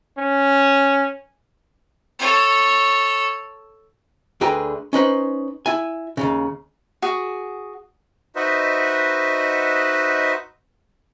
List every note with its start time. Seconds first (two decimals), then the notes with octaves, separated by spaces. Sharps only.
0.18 C#4
2.19 A4 C#5
4.41 D2 D3 G#4 B4 G5 A#5
4.93 C#4 D#4 B4 C5
5.66 E4 G#5
6.17 D#2 A#2 C#3
7.02 F#4 G#4
8.36 D#4 F#4 B4 C5 D#5 E5